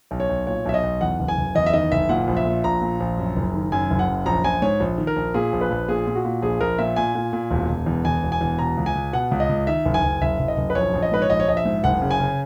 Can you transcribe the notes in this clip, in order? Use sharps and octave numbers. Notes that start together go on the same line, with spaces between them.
B1
C#5
B1
A#2 C#5
B1 E5
D#5
B1
E2 F#5
F#1
G#5
F#1
E2 D#5
E5
D#3 D#5
F#1 E5
A#2 F#5
A#1
E5
A#2
A#1 A#5
A#2
A#1
F#2
F#1
D#3
F#2 G#5
F#1
F#5
F#2
A#1 A#5
A#1 G#5
G#2 C#5
A#1
D#3
A#4
A#1
A#2 G#4
A#1
B4
A#1
A#2 G#4
A#2
F#4
A#2
A#1 G#4
A#1 A#4
A#2 E5
A#2 G#5
A#2
A#2
E1
E1
E2
E2 G#5
E1
G#5
E2
B2 A#5
C#2
G#5
C#2
B2 F#5
C#2
D#5
C#2
D#3 E5
F#1
G#5
F#1
F#1 E5
F#1
D#5
F#1
B4
A#1 C#5
A#1
D#5
G#2 B4
C#5
A#1 D#5
C#5
A#1 D#5
E5
G#2
F#1 F#5
C#3
G#5
C#3